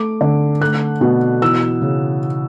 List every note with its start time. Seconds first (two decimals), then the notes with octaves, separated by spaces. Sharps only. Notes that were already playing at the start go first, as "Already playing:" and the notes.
Already playing: A3 D6
0.21 D3
0.61 A3 F#6
1.01 B2
1.42 E3 E6
1.82 C#3